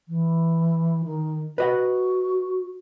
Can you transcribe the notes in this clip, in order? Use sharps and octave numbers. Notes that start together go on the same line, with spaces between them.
E3
D#3
F#4 B4 D#5 F#5